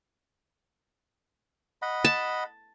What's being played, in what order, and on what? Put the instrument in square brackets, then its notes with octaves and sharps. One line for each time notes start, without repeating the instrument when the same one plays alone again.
[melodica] D#5 F#5 B5
[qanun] A5